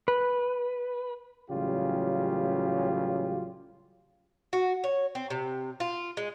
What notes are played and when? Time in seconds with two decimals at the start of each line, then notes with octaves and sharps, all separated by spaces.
0.08 B4
1.50 A1 C#3 F#3 G3 F4 G4
4.53 F#4
4.84 C#5
5.15 C4
5.30 C3
5.80 F4
6.17 G#3